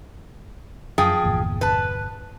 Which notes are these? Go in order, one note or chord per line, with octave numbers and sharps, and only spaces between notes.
F#2 F3 G#4 G5
G1 E2 A#2
B4 A5